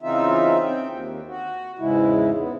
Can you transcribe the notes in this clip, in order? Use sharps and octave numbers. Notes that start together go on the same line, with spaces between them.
C#3 E3 C4 D#4 F4 E5
C4 G5
D#2
F#4
E2 G#2 C#3 G#3 E4
B3